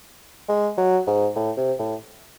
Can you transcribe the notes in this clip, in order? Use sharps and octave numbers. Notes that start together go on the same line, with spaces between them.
G#3
F#3
G#2
A2
C3
A2